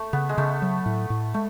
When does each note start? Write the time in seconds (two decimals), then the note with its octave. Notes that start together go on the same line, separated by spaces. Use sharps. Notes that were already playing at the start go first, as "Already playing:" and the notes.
Already playing: A3
0.13 C#3 B3
0.29 G#3
0.38 C#3 A3
0.62 F#3
0.86 A2
1.10 A2
1.34 G#3 A3